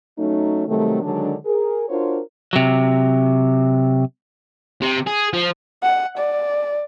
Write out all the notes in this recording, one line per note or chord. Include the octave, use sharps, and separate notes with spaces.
F#3 A3 C#4 D#4
C3 D#3 F#3 G3 A3
D3 D#3 F#3 G#3 D4
G#4 A#4
D4 F4 F#4 A#4 C5 C#5
C3 F#3
C3
G#4
F3
F#5
D5